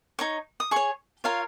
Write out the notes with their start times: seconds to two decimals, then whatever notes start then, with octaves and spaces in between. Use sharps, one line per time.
0.19 D#4 C#5 C#6
0.60 D#6
0.71 G#4 C#5 C#6
1.24 F4 A#4 C#5 F5